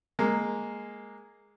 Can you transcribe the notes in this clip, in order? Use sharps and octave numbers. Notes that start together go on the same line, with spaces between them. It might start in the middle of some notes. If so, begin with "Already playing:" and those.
G#3 A#3